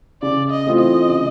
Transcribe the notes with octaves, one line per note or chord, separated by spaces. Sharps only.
C#3 D5
D#5
E3 A3 C4 F4
D#5
C#3